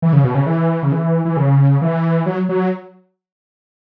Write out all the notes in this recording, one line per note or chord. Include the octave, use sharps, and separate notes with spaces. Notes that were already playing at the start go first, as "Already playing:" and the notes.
E3
C#3
B2
C#3
E3
C#3
E3
E3
C#3
E3
F#3
F#3